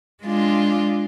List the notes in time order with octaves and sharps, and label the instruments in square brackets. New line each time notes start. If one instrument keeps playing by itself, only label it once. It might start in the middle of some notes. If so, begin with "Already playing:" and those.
[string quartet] G#3 D4 F4